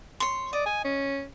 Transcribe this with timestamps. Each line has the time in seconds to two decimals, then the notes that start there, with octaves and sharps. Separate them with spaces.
0.20 C#5 C6
0.53 D5 D#5
0.66 G#5
0.84 C#4